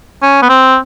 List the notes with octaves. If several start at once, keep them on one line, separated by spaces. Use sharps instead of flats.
C#4
B3
C4